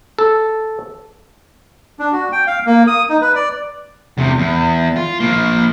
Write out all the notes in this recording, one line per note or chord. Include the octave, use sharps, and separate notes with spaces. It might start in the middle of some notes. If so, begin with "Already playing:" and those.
A4
D4
F#4
G5
F5
A#3
D#6
D#4
B4
D5
E2 C3
E2
F4
F3 A#3